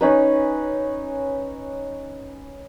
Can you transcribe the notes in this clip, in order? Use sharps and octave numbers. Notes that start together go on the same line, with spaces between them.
C#4 D#4 B4